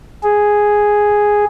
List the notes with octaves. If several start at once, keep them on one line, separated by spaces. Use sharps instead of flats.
G#4